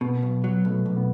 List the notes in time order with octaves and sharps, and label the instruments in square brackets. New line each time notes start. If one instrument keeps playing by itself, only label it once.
[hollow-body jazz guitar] B2 [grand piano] B3
[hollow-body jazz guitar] B1
F#3
[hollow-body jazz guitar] B1 [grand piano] A3
[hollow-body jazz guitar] B1
[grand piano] B3